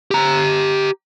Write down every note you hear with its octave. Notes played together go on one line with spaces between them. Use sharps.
G4 A#5